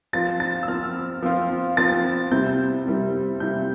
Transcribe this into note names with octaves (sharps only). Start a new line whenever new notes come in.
F3 C4 F4 A6
A6
E6
F3 C4 F4 F6
F3 C4 F4
F3 C4 F4 A6
C3 G3 C4 E4 G6
C3 G3 C4 E4
C3 G3 C4 E4 G6